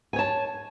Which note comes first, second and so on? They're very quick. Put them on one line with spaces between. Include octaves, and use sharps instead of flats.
G#5 C#5 A5